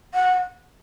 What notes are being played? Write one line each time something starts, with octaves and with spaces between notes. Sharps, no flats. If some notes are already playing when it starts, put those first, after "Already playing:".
F#5